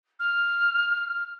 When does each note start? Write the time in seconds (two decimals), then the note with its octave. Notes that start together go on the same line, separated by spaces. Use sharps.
0.19 F6